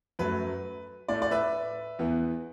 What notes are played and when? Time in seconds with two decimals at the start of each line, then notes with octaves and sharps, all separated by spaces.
0.19 F#2 F#3 A3 B4
1.08 A2 A3 D5
1.22 D5
1.31 B4 E5
1.99 E2 E3 B3